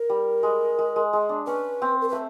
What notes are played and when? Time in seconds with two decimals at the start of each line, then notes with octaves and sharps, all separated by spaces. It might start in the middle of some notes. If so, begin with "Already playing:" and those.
Already playing: A#4
0.10 G3
0.43 G#3
0.79 G#3
0.96 G#3
1.13 G#3
1.29 D4
1.47 C#4 B4
1.82 C4
2.01 A#4
2.09 B4
2.12 A3